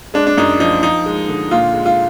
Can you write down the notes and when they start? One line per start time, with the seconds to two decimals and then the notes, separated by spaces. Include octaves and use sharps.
0.14 G#3 D4
0.27 D4
0.37 F#2 D#4
0.60 F3 D#4
0.83 F3 D#4
1.06 G#3
1.28 D3
1.51 A#2 F4
1.74 G#3
1.86 F4